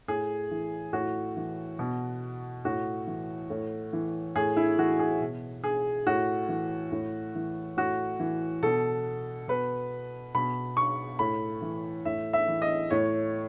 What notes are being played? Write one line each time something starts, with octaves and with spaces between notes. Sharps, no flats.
A2 G#4
E3
A2 F#4
E3
B2
A2 F#4
E3
A2
E3
A2 G#4
E4
E3 F#4
G#4
B2
G#4
A2 F#4
E3
A2
E3
A2 F#4
E3
B2 A4
B2 B4
B2 B5
C#6
A2 B5
E3
A2 E5
E5
E3
D#5
A2 C#5